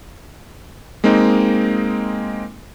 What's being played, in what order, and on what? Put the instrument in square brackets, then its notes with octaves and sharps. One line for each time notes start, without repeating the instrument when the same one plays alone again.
[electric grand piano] G#3 A#3 C4 D#4